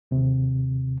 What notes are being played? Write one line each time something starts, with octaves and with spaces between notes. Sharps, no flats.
D#2 C3